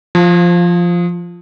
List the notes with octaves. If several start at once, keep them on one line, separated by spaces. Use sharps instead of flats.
F3